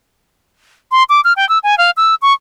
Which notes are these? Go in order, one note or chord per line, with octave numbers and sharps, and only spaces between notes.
C6
D6
F6
G5
E6
G#5
F5
E6
C#6